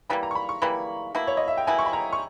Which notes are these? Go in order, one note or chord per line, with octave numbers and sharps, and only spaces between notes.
E3 G3 A#3 B5
A#5
C#6
B5
C#6
E3 G3 A#3 B5
B2 A#3 E4
C#5
D#5
E5
G5
B2 A#3 E4 G#5
C#6
B5
A#5
C#6